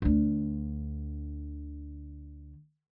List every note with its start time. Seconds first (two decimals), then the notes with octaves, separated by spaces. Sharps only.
0.02 D2 D3